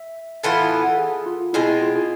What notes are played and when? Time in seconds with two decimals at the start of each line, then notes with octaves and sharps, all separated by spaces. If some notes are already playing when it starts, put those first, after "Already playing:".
Already playing: E5
0.44 A2 E3 B3 F4
0.88 A4
0.98 G#4
1.26 F4
1.53 B2 G#3 C4 E4
1.67 E4
1.81 F4
1.95 G#4